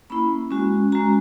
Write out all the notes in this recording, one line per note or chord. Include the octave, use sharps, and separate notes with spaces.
A#3 C#4 E4 B5
G#3 C#4 F#4
G#3 C#4 F#4 A#5